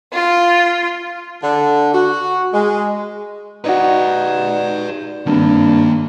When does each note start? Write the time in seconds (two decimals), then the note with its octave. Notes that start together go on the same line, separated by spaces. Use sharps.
0.12 F4
1.42 D3
1.94 F#4
2.52 G#3
3.64 D#4 F#4 B4 D5
5.26 G#1 G2 D#3 A#3